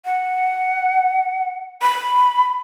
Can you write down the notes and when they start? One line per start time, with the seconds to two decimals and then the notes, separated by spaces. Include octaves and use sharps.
0.05 F#5
1.82 B5